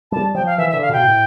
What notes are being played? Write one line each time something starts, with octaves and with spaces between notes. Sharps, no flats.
G3 A5
F3 G5
F5
E3 E5
D3 E5
F5
B2 G5
A2